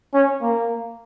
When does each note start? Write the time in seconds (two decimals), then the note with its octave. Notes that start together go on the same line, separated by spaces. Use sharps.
0.14 C#4
0.42 A#3